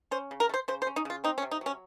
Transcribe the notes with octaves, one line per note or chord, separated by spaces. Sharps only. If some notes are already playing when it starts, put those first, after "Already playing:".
C#4 C5
C#3
A#4
A3
C5
C#3 C5
C5
C#4
D#4
C#3 F4
C4 D#4
C#4
C3
D#4
F#3 C#4